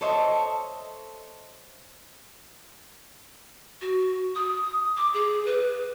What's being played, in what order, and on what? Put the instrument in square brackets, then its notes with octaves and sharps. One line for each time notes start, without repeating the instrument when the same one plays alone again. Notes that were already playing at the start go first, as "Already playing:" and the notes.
[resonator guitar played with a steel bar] A4 C5 C#5 D#5 E5
[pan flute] F#4
D#6
D6
G#4
B4